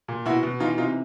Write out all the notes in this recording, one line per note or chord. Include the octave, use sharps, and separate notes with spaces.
A#2
B2 E4 F#4
B2
E3 D#4 F4
C3 D#4 F4